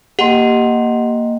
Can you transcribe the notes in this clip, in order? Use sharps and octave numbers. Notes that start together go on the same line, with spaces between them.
A#3 G4 D#5 F#5 G5 C6